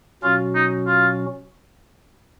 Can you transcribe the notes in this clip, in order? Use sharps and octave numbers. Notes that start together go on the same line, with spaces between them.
B2 F#3 C#4 F4 F#4
D#4
F4